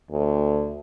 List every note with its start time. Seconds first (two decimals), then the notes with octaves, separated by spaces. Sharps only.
0.11 D2